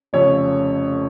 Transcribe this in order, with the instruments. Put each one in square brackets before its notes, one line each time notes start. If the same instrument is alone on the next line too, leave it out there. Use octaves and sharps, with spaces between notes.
[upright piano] F1 F2 C#3 C#5